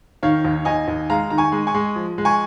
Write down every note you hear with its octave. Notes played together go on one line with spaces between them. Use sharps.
D#3 C#5 F5
D#2
D#2 D#5 G#5
D#2
G#3 F5 A#5
D#3 A#5
G#5 C#6
G#3
G#5 C#6
G#3
F3
G#3
G#5 C#6